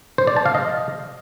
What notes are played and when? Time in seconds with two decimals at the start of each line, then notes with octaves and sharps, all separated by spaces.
0.18 C5
0.27 D5
0.36 A5
0.46 F5
0.55 D#5